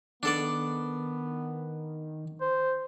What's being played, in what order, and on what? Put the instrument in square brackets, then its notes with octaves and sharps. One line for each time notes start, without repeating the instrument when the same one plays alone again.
[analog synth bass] D#3 [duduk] B3 [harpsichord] D4 A4 D5
[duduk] C5